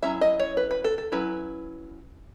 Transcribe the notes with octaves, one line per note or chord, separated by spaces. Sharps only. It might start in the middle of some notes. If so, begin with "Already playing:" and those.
F#3 C#4 E4 E5
D#5
C#5
B4
B4
A4
A4
F#3 C#4 E4 B4